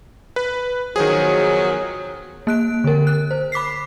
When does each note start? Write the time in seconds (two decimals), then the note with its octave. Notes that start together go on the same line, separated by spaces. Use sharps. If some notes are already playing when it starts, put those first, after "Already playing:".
0.36 B4
0.96 B2 D#3 F3 F#3 G#4
2.47 A#3 F#6 D7
2.84 D3 A#4
3.07 F#6
3.31 C5
3.52 B5 D6 B6 C7